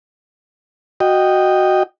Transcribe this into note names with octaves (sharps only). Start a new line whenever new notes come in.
F#4 D#5 G5